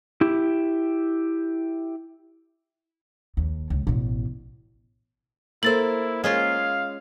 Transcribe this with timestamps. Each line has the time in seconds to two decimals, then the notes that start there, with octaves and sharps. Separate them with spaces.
0.21 E4 G4
3.37 D#2
3.70 C#2
3.87 A1 B2
5.63 A#3 E4 A4 C5 A6 F#7
6.24 G#3 C#4 F4 F5